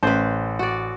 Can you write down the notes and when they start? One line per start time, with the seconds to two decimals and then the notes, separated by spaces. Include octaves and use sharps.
0.03 A1 B4 C5
0.59 F#4 D5